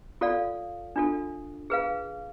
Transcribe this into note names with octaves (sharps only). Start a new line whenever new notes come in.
F4 A4 D5 F5
D4 F4 A4
G#4 B4 F5